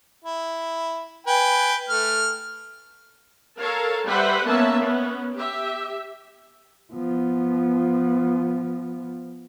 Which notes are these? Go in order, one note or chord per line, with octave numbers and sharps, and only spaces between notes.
E4
B4 G5 G#5
A3 F6
A4 A#4 C#5 F5 A5
G3 B4 C5 E5 F#5 B5
A#3 B3 C#4 E5 A5
B3 C#4
G4 E5
F3 B3